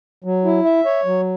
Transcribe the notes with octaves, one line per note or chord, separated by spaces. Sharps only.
F#3
E4
E5
C#5
F#3